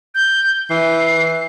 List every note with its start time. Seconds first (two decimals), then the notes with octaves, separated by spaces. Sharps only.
0.15 G6
0.70 E3 C7